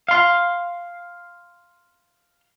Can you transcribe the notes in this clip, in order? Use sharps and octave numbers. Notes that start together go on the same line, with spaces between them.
F5 C6